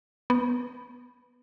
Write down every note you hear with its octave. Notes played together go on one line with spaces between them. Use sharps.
B3